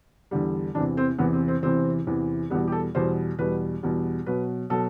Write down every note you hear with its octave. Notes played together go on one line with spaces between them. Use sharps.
E2 D3 G3
E2 C3 E3 D4
C4
E2 C3 E3 B3
C4
C4
E2 C3 E3 C4
E2 C3 E3
E2 B2 G3 B3
G4
A4
E2 B2 G3 C5
E2 B2 G3 B4
E2 B2 G3
B2 F#3 B4
B2 F#3 A4